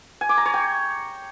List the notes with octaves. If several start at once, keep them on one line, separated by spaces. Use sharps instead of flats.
G#5
D6
A#5
C#5
G5